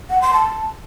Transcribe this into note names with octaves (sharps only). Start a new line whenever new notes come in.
F#5
C6
A5